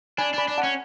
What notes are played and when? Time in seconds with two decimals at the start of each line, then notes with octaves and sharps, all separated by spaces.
0.18 D4 G#5 B5
0.34 D4 G#5 B5
0.48 D4
0.58 F#5 A5
0.63 C#4